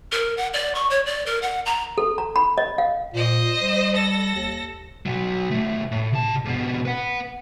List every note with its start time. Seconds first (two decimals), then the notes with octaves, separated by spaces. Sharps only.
0.12 A#4
0.37 F#5
0.54 D5
0.75 C#6
0.90 C#5
1.06 D5
1.26 A#4
1.42 F#5
1.66 A#5
1.98 A4
2.18 A#5
2.36 B5
2.58 D#5
2.78 F5
3.14 A#2 C5 D#5
3.62 G3
3.94 A4 A#6
4.35 D#2
5.06 B2 F#3
5.51 B1 A3
5.92 A2
6.13 C3 A5
6.45 G#2 B2
6.86 B4 F#5